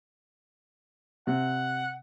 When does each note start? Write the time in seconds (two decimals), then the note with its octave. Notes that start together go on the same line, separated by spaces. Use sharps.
1.27 C3 F#5